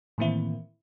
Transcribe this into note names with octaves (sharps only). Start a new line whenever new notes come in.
A2 D#3 E3 A#3 C4 E4